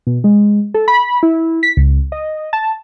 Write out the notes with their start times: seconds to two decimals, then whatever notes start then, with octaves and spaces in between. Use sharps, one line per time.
0.07 B2
0.24 G#3
0.74 A4
0.88 B5
1.23 E4
1.63 B6
1.77 C#2
2.12 D#5
2.53 A5